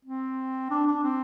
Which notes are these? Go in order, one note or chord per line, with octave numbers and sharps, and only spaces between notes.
C4
D4
D4
C4